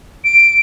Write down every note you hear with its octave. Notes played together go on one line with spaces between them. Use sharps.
D7